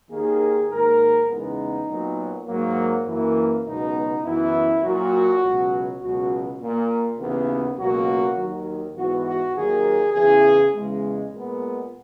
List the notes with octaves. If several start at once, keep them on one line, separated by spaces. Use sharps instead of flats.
D#2 D#3 A#3 G#4
G#2 D#3 A#3 A#4
E2 C#3 G#3 B3 D#4
A#2 F#3 B3
G#2 F#3 A#3
F#2 E3 A#3
C#2 B2 F#3 B3 D#4
F#2 E3 B3 E4
A#2 F#3 A#3 F#4
C#2 B2 F#3
C#2 B2 F#3 F#4
A#2 A#3
D#2 C#3 E3 B3
C#2 B2 F#3 A#3 F#4
D#2 D#3 F#3
G#2 E3 B3 F#4
F#4
D#2 D#3 F#3 A#3 G#4
E2 C#3 E3 G#4
E2 C#3 G#3
A#2 G#3 B3